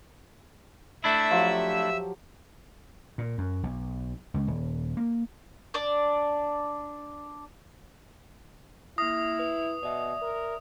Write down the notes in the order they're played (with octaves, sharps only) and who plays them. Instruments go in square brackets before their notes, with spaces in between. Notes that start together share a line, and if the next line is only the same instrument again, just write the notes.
[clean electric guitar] A3 D4 E4 [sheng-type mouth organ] E5 E6
[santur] F3 F#3 G4
[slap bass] A#2
F#2
B1
C#2
D#1
A#3
[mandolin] D4 D5
[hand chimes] A#3 F6 A#6 [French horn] E4 [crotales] D#6
[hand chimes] B4
[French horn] B2 [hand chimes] D5 E5
[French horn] A#4